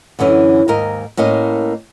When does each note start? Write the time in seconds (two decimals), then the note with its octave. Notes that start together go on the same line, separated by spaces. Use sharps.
0.19 F#2 D3 E3 C#4
0.68 D#2 G#2 A#4 D#5
1.17 A2 A#3 C#4 D#5